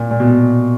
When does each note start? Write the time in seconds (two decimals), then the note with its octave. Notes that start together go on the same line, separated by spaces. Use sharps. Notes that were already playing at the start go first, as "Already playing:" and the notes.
Already playing: A#2
0.11 A#2
0.20 B2